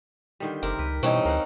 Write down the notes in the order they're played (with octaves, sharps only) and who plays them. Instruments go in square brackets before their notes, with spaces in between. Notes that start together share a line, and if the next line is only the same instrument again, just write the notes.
[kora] D3 D#3 G3
[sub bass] F#1 [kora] C3 C4 G4 [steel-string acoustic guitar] A#4
[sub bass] C#2 [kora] B4
[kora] G2 E3 C#5 [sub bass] B2 [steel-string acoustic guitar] C4 C#4 D#4
[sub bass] D2 [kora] A#4 F5 F#5